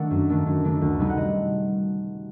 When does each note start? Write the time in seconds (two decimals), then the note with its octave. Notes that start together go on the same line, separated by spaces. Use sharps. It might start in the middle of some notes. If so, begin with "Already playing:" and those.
Already playing: D#3 A3 D4 F#5
0.11 F#2
0.29 D#3 A3 D4
0.46 F#2
0.64 D#3 A3 D4
0.82 D2
0.99 C3 G3 C4 D#4
1.10 F#5
1.17 D#5